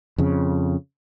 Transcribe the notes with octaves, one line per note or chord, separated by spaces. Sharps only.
F2 C#3